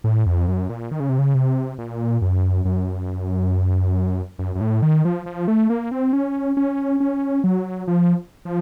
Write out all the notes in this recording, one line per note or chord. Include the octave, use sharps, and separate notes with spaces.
A2
F2
F#2
A#2
D#3
C#3
C3
C#3
C3
A#2
F#2
F#2
F#2
F#2
A2
D#3
F3
F3
A3
A#3
C4
C#4
C#4
C#4
F#3
F3
F3